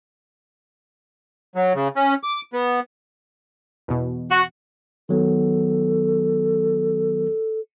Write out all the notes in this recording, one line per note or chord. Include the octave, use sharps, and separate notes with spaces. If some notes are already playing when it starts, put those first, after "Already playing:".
F#3
C#3
C#4
D6
B3
E2 B2
F#4
D#3 F#3 B3 A4